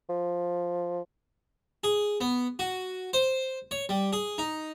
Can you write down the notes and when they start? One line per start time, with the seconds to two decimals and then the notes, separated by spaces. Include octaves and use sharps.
0.09 F3
1.84 G#4
2.21 B3
2.59 F#4
3.13 C5
3.71 C#5
3.89 G3
4.13 G#4
4.38 D#4